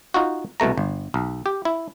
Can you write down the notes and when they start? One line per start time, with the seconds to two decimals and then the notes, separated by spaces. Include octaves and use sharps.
0.14 D#4 F4 F#4
0.60 C2 B2 A3 A#5
0.78 G1
1.14 B1
1.46 G4
1.65 E4